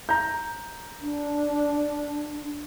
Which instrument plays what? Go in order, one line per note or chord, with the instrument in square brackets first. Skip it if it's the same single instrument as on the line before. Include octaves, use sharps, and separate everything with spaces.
[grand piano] A#5 G6
[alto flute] D4